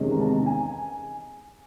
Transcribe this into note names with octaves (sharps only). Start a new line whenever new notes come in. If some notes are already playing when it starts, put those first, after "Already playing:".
Already playing: E2 C3 D#3 G#3 C#4
A#5
A5
A#5
G#5